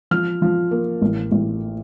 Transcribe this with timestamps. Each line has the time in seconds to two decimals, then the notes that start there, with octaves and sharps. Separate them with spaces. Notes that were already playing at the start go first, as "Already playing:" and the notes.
0.11 F3 F6
0.42 F3
0.71 A#3
1.02 A1
1.32 A1